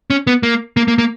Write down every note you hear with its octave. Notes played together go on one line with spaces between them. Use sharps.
C#4
B3
A#3
A#3
A#3
A#3